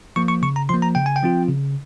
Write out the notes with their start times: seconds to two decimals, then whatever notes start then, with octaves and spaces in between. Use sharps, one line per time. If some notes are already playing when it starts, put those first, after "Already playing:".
0.16 F3 A#3 C#6
0.28 C#6
0.42 C#3 C#6
0.56 A#5
0.69 F3 A#3 C6
0.82 A#5
0.95 C#3 G5
1.06 G#5
1.16 G5
1.23 F3 C4 F4
1.48 C#3